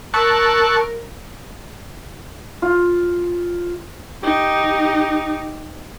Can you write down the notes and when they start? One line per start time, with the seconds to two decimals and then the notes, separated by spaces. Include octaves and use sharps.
0.14 A#4 A5 C#6 E6 F#6
2.62 F4
4.23 D#4 G4